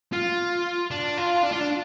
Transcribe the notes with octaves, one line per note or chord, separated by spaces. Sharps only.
F4
D4
F4
D4
F4
D4